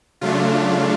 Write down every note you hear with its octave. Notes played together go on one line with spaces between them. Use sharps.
C#3 F#3 A3 D4 F4